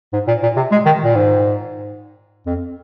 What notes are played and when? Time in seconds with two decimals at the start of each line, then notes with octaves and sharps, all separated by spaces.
0.13 G#2
0.27 A#2
0.43 A#2
0.56 C3
0.72 G#3
0.85 D#3
1.04 A#2
1.15 G#2
2.46 F2